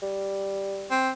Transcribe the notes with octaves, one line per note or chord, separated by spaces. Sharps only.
G3
C4